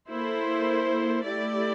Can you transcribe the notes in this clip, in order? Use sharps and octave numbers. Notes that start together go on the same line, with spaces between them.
A#3 E4 A4 C5
A3 E4 G4 D5